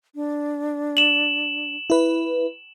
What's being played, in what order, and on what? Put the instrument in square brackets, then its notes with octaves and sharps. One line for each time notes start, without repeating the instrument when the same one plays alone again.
[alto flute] D4
[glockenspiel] E7 F#7
[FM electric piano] E4 B4